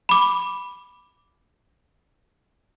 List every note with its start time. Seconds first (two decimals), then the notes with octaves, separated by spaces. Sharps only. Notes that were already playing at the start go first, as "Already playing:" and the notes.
0.09 B5 D6